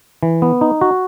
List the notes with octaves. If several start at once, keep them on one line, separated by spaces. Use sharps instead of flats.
E3
B3
D#4
F#4